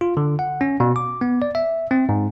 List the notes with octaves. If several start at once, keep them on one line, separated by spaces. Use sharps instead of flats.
F4
D3
F#5
C#4
B2
D6
B3
D5
E5
C4
G#2